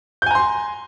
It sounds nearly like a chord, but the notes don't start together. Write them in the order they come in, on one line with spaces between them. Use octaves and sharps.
G6 G#5 A#5 C6